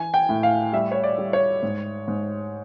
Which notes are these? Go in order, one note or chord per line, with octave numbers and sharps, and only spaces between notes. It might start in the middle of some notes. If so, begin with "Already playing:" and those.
Already playing: E3 G#5
G5
A2
F5
G3 E5
C#5
D5
G3
C#5
G#2
G#2